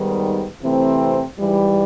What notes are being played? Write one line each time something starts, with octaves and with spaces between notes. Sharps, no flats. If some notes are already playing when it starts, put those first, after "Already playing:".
Already playing: G#2 D#3 G3 B3
C3 E3 A3 C4
G#2 E3 G3